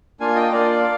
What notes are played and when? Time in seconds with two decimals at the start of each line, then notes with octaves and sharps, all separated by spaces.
0.20 A#3 D4 F4 F5 G#5
0.36 D#5 G5
0.52 A#3 D4 F4 D5 F5